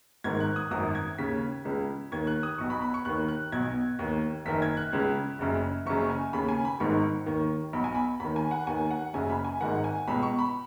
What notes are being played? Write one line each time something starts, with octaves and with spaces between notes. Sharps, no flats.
G#1 G#2 D#3 G#6
F#6
D#6
G#1 F#2 D#3 D#6
G#6
D#2 C#3 B6
C#2 C#3
D#2 D#3 G#6
F#6
D#6
B1 B2 C#6
B5
B5
C#6
D#2 D#3 F#6
F#6
B1 B2 G#6
D#2 D#3
F#1 F#2 D#3 B6
G#6
F#6
C#2 C#3
F#1 F#2 C#3
F#1 F#2 C#3 C#6
G#5
D#2 C#3 B5
G#5
B5
G#1 G#2 D#3 C#6
D#2 D#3
B1 B2 B5
G#5
B5
D#2 D#3 B5
G#5
F#5
D#2 D#3 G#5
F#5
F#1 F#2 C#3 G#5
B5
G#5
G#1 G#2 D#3 F#5
G#5
C#2 B2 B5
C#6
B5